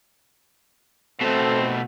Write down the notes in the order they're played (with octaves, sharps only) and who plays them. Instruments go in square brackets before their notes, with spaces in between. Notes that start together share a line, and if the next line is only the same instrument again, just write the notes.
[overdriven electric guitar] B2 A3 [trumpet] C4 [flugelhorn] A4